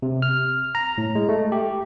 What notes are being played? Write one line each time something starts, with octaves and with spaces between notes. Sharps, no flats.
C3
F6
A#5
A2
G#3
A3
G4